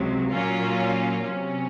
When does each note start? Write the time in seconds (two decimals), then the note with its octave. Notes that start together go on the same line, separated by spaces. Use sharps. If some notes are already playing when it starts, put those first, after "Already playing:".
Already playing: C#2 C3 F#3
0.31 A#2 F#3 A#3 C#4 F4
1.24 C3 F#3 C#4